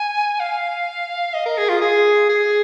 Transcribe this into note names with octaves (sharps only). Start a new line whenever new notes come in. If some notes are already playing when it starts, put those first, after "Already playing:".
Already playing: G#5
F5
D#5
A#4
G#4
F4
G#4
G#4